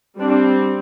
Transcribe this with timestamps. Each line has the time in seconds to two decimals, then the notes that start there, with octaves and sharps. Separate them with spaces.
0.19 G3 C4 D4